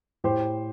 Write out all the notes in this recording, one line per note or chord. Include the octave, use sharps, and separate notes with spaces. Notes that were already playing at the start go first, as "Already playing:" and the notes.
A2 G4 C5